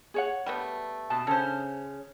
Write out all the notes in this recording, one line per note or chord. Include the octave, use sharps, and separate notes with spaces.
G#4 C#5 F#5
G3 A3 B3
B2 A5
C#3 C#4 A4 C5